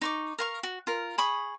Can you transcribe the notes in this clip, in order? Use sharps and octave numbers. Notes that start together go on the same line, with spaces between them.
D#4 C#6 D6
A#4 F5 C#6
F#4
F4 A#4
G#4 B5 C#6 D#6